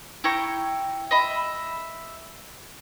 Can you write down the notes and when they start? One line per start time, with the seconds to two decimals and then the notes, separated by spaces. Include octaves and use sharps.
0.24 E4 G5 A#5 C#6
1.11 D#5 E5 B5